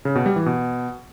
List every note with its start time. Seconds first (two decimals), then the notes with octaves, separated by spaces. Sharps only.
0.05 C#3
0.15 B2
0.26 G3
0.36 E3
0.46 B2